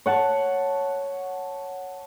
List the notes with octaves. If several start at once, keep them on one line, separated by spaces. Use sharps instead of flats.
C#5 F#5 A5